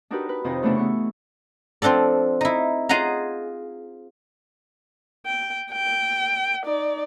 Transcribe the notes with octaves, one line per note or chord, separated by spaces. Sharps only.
D4 D#4 F#4 G4 A#4 B4
B4
F2 C3 D#3 D#4 F4 D#5
C#3 E3 A3 B3 D4 E4
B3 C#6
F3 C4 D4 A4 D5
D#4 E4
F4 G#4 D#5 F5 F#5 A#5
G5
G5
D#4 D5